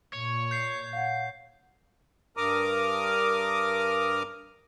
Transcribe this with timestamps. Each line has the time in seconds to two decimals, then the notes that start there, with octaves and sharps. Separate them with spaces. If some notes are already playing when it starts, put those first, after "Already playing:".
0.13 A#2 C#5
0.51 G6 C7
0.93 F5 F#5
2.37 G2 A#4 A#5 D6 D#6 F6